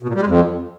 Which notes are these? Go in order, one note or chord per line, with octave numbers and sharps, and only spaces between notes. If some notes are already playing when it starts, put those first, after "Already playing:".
B2
A#2
G3
G#3
F2